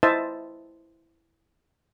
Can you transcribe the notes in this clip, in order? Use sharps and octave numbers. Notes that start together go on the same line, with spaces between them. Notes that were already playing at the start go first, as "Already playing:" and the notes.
E4 C5 D#5 E5 A5